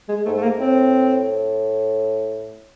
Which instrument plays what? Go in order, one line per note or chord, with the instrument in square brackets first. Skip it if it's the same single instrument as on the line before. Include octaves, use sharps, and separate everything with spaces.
[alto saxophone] G#3
[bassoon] G#2 [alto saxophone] A3
[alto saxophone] A3
A#3
[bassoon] A2 [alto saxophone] C4